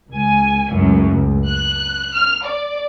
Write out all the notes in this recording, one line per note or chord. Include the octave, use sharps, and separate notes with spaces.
C#2 G#5
C#2 F#2 A2
C#2
F#6
F6
D5